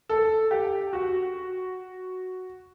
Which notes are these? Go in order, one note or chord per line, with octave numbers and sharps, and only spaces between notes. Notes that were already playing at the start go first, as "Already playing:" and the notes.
A4
G4
F#4